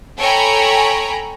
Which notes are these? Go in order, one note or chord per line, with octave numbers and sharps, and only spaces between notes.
A4 C#5 G5 G#5 A#5 B5